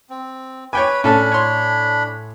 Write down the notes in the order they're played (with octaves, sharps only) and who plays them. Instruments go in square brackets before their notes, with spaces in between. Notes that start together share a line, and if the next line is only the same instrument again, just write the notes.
[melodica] C4
[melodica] B4 B5 [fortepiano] C#5 G5 G#5 [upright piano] D6
[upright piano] A2 G#5 A5 [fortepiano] C#4 A4 [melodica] D4 B5
[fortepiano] C#5 C6